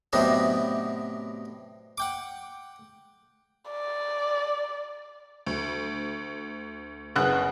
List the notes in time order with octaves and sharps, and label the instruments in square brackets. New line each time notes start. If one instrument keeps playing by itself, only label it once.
[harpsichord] A2 C3 F#3 B3 D4 D#4
F#5 G5 D6
[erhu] D5
[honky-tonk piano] D2
[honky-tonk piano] F#1 C#3 F#6 [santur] B3